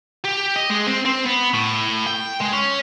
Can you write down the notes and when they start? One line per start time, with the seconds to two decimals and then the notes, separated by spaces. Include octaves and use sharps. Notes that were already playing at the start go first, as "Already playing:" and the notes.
0.24 G4
0.56 D#5
0.70 G#3
0.87 C4
1.05 C4
1.26 B3
1.54 A2
2.07 G5
2.41 G#3
2.53 C#4